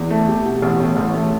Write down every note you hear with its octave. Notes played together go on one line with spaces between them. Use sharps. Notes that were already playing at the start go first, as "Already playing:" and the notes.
Already playing: E2
A3
G4
B2
A1
A2
A1
A3